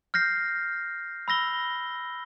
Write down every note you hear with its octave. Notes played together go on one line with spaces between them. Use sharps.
F6 G6 A#6 C7
B5 E6 A#6 G7